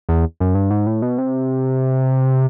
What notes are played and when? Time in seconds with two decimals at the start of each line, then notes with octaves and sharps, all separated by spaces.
0.09 E2
0.40 F#2
0.55 G2
0.71 G#2
0.87 A2
1.02 B2
1.18 C3